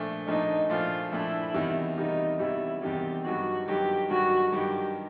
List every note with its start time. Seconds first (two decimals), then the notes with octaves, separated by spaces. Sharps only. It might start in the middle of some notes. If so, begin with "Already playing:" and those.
Already playing: A#2 F3 A3 D4
0.27 A#2 F3 A3 D4 D#4
0.69 A#2 F3 A3 D4 F4
1.12 A#2 F3 A3 D4 E4
1.54 E2 C3 D#3 G3
1.97 E2 C3 D#3 G3 D#4
2.39 E2 C3 D#3 G3 E4
2.82 E2 C3 D#3 G3 G4
3.25 G2 D#3 F#3 F#4
3.67 G2 D#3 F#3 G4
4.10 G2 D#3 F#3 F#4
4.53 G2 D#3 F#3 G4